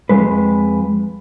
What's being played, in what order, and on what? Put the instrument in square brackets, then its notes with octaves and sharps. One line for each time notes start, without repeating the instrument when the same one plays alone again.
[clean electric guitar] F2 G#3 B4